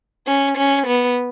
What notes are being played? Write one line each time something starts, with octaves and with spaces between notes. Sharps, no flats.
C#4
C#4
B3